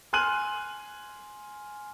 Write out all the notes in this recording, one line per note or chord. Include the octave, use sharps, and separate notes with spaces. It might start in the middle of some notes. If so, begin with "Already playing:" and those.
G#5 C6 F6 F#6 D#7 F#7